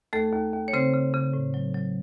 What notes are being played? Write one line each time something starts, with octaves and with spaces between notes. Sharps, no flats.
D#2 A3 A4
D#2
D#2
C#5
C#3 C4 C5
C#3
C#3
A2
F#3
F#3